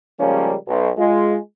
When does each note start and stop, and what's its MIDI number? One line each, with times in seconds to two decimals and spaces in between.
0.20 0.55 49
0.20 0.55 53
0.20 0.55 55
0.20 0.55 56
0.20 0.55 58
0.20 0.55 61
0.68 0.89 35
0.97 1.37 56
0.97 1.37 65